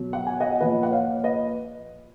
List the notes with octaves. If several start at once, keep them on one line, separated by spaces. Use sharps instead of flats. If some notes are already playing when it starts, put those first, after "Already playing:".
Already playing: B2 F#3
F#5
G#5
D#5 F#5
A#2 F3 B4 D#5
F#5
C#5 F5
B4 D#5